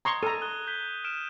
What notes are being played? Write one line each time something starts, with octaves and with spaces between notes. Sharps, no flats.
A#5 C6 C#6 D#6 G#6
A4 A#5 D#7
D#6 F#6 G7
G6 B6 G7
F6 D7 E7